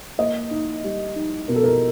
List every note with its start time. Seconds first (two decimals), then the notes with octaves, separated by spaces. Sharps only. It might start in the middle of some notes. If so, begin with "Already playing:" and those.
0.18 A#3 D#5
0.51 D#4
0.84 G3
1.16 D#4
1.48 B2 A#4
1.56 A4
1.63 A#4